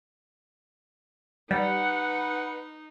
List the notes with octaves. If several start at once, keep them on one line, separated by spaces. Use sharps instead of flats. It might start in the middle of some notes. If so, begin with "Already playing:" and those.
G3 D#4 B4 F#5